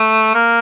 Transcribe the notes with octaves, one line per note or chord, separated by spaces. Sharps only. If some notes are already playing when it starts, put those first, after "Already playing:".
Already playing: A3
A#3